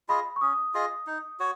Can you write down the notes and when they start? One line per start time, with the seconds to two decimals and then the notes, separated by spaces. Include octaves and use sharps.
0.08 F4 G#4 D#5 B5
0.36 C#6
0.41 C#4 D#6
0.74 F4 G#4 D#5
1.07 D#4
1.40 F#4 C#5